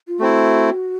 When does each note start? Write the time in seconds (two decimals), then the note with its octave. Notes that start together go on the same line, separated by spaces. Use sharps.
0.08 F4
0.19 A3 C4 E4 F#4